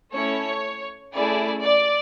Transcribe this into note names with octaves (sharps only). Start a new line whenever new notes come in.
A3 C#4 E4 C#5
A3 C#4 E4 G#4 D5
D5